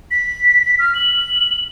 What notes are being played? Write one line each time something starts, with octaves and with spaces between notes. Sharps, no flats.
B6
F6
F#7